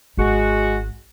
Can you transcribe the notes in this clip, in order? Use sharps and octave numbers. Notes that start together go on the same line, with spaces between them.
G#1 G#3 F#4